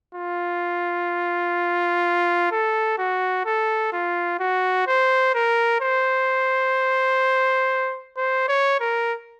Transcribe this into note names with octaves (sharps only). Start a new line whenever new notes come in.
F4
A4
F#4
A4
F4
F#4
C5
A#4
C5
C5
C#5
A#4